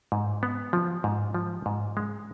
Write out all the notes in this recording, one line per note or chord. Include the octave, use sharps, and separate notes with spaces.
G#2
B3
F3
G#2
F3
G#2
G#3